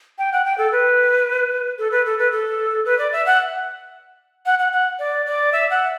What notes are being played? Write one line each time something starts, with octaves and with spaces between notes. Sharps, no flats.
G5
F#5
G5
A4
B4
A4
B4
A4
B4
A4
B4
D5
E5
F#5
F#5
F#5
F#5
D5
D5
E5
F#5